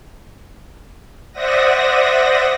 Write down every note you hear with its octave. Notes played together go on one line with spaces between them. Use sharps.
C5 D5 E5 F#5 D#6 A#6